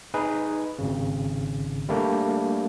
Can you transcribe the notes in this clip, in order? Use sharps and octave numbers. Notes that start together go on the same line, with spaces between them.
D#4 G#4 B4
G#1 C#3
G3 A3 A#3 D4